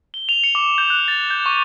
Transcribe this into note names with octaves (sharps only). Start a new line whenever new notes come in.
G7
F7
C#7
D6
G6
F#6
A6
G6
C#6